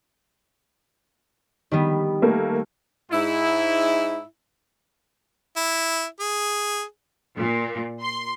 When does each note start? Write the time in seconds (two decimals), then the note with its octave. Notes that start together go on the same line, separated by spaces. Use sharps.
1.71 D#3 G3 B3
2.22 A3 A#3
3.12 G#2 E4
5.56 E4
6.20 G#4
7.37 A#2
8.02 C6